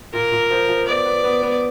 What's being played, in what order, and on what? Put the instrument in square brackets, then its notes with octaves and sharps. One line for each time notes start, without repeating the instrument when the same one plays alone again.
[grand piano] A#2 [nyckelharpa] A#4
[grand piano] A#2
F3
F3
[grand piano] B3 [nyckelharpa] D5
[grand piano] B3
B3
B3